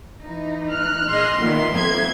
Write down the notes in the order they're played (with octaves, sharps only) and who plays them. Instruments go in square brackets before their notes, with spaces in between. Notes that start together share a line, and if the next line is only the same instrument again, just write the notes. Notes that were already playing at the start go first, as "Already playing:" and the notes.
[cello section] E3 D#4
[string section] F6 F#6
[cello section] A#2 G#4 D#5 [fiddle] C6
[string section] A#2 D#3 [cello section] B3 E5
[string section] F2 G#6